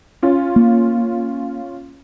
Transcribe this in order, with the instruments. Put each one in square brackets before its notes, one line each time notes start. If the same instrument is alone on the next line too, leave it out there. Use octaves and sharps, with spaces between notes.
[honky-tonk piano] C#4 F4
[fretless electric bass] A#3